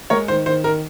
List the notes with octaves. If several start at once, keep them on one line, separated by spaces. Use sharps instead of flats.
G#3 A#4 C#5
D#3 C5
D#3 C5
D#3 A#4